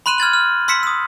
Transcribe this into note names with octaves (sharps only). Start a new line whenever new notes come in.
B5 C6 F#6 D#7 E7
F6 G#6 A6 F#7
F6
C6 E6 B6 C#7 E7
D#6 E6